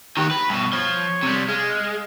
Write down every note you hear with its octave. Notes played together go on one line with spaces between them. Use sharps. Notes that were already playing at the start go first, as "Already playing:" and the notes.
D#3 F#4 G4
B4 B5
G2 B2
F3 C#5
C3 G3
G#3 F5